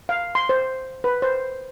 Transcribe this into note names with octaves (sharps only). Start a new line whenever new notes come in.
F5
C6
C5
B4
C5